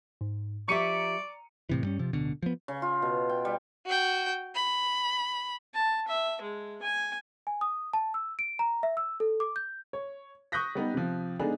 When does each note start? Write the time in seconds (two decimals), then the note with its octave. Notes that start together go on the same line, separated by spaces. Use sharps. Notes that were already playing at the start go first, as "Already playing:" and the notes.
0.21 G#2
0.68 F3 G4 D5 E5 A#5 C#6 C#7 D#7
1.69 A2 C3 E3
1.82 G2 G3 C#4
1.99 C3 F3
2.13 D1 B2 D3
2.43 F3 B3
2.68 C#3
2.82 F4
3.02 B2
3.29 G5
3.45 G3
3.86 F#4 G5
4.55 B5
5.74 A5
6.08 E5
6.41 G#3
6.82 G#5
7.47 G#5
7.61 D#6
7.93 A5
8.14 E6
8.39 D7
8.59 A#5
8.83 E5
8.97 E6
9.20 A4
9.40 D6
9.56 G6
9.93 C#5
10.52 C#6 D#6 F#6 G6 A#6 B6
10.75 G3 B3 D#4
10.94 C3 F3
11.40 G#3 B3 D4 D#4 G#4 A4